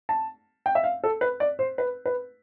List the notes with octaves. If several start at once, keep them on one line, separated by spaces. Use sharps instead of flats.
A5
G5
E5
F5
A4
B4
D5
C5
B4
B4